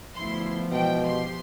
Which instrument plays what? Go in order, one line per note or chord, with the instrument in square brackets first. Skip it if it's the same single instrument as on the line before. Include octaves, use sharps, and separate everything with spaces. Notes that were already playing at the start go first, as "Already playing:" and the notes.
[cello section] D2 E4 [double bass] F3 B3 [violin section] C6
[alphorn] B2 [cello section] E3 G#3 C5 [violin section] G5
[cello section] G4 [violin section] C6